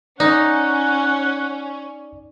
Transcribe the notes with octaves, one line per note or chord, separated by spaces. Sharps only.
C#4 D#4 D5 F#5